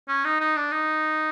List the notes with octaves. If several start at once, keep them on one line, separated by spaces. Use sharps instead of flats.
C#4
D#4
D#4
D4
D#4